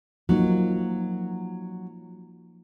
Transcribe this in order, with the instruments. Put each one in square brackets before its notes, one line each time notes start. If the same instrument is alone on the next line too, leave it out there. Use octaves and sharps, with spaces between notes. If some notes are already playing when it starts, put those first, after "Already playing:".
[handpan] F3 A#3 D#4 [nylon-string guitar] F#3